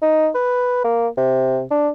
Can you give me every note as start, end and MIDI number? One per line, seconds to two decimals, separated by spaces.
0.02 0.29 63
0.35 0.83 71
0.84 1.08 58
1.17 1.62 48
1.71 1.89 62